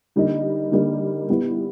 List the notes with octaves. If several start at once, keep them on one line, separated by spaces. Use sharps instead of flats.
D3 G3 A#3 D#4
D3 G3 A#3 D#4
G3 B3 E4